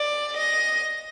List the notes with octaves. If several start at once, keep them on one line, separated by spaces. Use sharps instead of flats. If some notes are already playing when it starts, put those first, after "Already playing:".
Already playing: D5
D#5